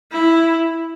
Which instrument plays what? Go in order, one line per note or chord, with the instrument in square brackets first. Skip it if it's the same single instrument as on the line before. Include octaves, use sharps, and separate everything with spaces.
[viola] E4